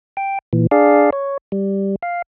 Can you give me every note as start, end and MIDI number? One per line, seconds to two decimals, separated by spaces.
0.17 0.39 79
0.53 0.67 46
0.53 0.67 52
0.71 1.10 62
0.71 1.10 68
0.71 1.10 74
0.71 1.10 77
1.13 1.38 73
1.52 1.96 55
2.03 2.22 77